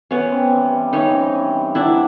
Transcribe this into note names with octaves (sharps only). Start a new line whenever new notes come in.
E3 B3 C#4
C4
G2
G3
E3 C#4 D#4
C4
G2
G3
F#3 D4 E4